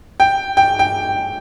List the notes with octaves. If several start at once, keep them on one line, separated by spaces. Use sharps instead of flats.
G5
G5
G5